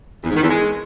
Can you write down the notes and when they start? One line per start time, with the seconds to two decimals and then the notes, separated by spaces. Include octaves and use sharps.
0.23 E2
0.30 G#2
0.36 D#3
0.43 E2
0.49 G#3